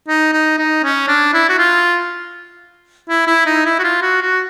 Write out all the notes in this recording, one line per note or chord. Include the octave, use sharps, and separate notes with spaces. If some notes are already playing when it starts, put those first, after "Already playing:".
D#4
D#4
D#4
C#4
D4
E4
F#4
F4
E4
E4
D#4
E4
F#4
F4
F#4
F#4